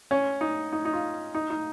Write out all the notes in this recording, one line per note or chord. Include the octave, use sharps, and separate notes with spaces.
C#4
D#4
D#4
D#4
F4
D#4
D#4